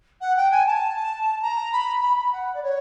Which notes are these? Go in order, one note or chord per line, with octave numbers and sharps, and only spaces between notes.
F#5
G5
G#5
A5
A#5
B5
B5
B5
F#5
D5
C#5